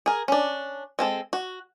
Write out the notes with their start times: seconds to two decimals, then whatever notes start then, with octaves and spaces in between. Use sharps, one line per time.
0.06 G#4 A#4
0.28 C#4 D4
0.99 G#3 C4 A4
1.33 F#4